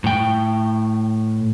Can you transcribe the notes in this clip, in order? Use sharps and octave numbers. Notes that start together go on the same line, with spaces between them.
A2 G5